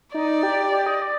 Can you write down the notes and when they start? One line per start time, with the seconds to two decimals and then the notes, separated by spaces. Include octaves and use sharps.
0.14 D#4 D5
0.43 G4
0.73 G4
0.86 D#5
1.02 D5